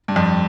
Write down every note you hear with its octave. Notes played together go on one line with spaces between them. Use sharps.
G2
F2